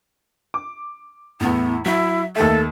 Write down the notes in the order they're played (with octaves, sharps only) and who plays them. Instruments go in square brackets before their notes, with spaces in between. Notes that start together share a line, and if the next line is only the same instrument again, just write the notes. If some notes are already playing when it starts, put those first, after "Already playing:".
[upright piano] D6
[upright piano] E2 A2 [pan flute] B3 [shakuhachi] E4
[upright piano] F#3 [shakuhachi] E4 [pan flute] E5
[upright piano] D#2 E5 [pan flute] A3 [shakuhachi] A4